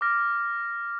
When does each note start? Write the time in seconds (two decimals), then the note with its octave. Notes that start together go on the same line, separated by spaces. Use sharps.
0.01 D6 F6 A#6